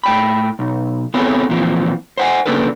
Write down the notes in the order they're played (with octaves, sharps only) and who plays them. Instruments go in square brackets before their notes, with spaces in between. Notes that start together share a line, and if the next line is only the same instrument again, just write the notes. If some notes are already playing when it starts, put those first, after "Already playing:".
[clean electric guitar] A2 G5 B5
B1
B3 C4 E4 G#4 A4 C#5
E2 A#2 E3 F3 C4
C5 F#5 G#5
C#3 A#3 C#4 D4 A4 B4